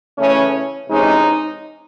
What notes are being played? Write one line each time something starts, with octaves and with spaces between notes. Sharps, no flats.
C#3 E3 A3 C#4
C3 E3 G#3 C#4 D#4